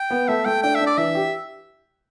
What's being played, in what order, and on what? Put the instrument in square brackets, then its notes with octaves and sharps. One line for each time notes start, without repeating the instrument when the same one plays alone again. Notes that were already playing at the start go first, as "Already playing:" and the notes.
Already playing: [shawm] G5
[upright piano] B3
[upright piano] A3 [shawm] E5
[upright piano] A3 [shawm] G5
[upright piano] D4 [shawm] G5
[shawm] E5
[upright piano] D4
[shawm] D5
[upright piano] E3 [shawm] E5
[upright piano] G4